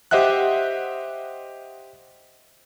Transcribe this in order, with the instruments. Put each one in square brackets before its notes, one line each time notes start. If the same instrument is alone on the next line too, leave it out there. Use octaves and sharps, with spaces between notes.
[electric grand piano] G4 C5 D#5 E5 F#5 F#6